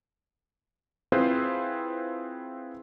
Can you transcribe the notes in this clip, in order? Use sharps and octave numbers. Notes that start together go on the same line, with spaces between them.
C4 E4 F4 G#4 B4 C5